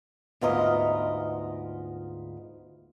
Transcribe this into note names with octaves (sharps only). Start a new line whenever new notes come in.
D2 G#2 B3 F4 A#4 D#5